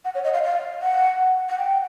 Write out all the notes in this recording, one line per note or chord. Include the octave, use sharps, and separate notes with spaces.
F#5
C#5
D#5
F5
F5
F#5
F#5
G5